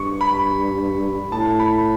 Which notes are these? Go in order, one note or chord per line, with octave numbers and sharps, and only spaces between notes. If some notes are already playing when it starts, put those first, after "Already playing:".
Already playing: G2 C#6
B5
A2 A5
B5